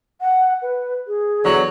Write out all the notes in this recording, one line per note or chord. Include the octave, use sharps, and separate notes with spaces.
F#5
B4
G#4
E2 D3 F#3